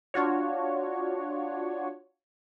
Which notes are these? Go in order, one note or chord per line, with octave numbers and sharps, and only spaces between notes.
D4 F4 F#4 C#5